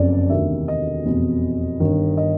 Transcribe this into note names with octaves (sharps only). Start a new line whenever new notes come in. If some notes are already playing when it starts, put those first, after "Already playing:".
Already playing: F#1 F2 C#3 D5
E1 D2 C3 D#3 E5
D#5
F1 E2 B2
G1 G2 D#3
D#5